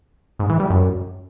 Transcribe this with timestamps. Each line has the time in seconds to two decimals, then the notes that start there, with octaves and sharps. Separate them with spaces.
0.39 G#2
0.50 E3
0.60 G3
0.70 F#2